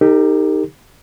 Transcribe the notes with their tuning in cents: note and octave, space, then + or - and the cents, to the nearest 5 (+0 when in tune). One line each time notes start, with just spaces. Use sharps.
D#4 +0 G4 +15 A#4 -45